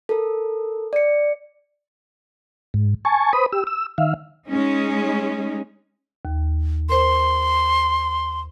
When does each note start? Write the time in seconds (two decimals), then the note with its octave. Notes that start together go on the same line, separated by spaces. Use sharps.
0.09 A4 A#4
0.93 D5 C#7
2.74 G#2
3.05 G#5 A5 C#6
3.33 B4 C5 B5 D#6
3.52 G4 E6
3.67 E6
3.98 D#3 E5 F5
4.49 G#3 C#4 D#4
6.25 D#2
6.89 A#4 C5 C6